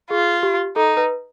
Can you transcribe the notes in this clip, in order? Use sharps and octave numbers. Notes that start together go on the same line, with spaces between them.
F4 G#4
G4
D#4 A4
B4